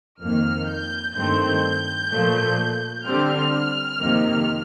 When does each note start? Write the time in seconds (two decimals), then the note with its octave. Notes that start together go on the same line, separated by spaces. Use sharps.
0.20 F2 D#3 A#3 F6
0.67 G6
1.15 G2 D#3 A3 C4 G6
2.10 A#2 F3 A3
3.05 D3 G3 C4 F6
4.00 F2 C3 D#3 A#3